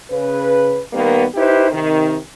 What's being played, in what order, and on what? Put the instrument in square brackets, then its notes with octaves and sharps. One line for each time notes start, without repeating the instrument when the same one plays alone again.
[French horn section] C#3 B4
D#3 G3 A#3 B3
D#4 E4 G4 B4 C5
C3 D#3